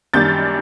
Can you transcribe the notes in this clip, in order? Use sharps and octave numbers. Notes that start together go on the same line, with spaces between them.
F#2 D#3 G3 A#3 D4 G6 A6